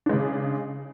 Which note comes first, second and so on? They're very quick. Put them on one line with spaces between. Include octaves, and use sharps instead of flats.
D4 G#3 C#3